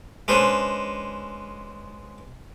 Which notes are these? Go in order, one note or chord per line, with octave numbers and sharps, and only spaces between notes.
G#3 C#4 D4 B4 C5